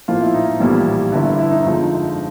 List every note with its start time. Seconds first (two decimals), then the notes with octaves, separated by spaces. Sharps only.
0.08 A#1 A2 F3 A#3 F4
0.22 E4
0.34 D#4
0.60 A#1 A2 E3 G3 A#3
1.12 G1 G2 D3 E4
1.39 E4
1.51 D#4
1.65 F2 D3 F3 G#3